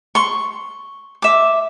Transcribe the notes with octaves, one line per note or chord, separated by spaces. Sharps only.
C6 C#6
E5 D6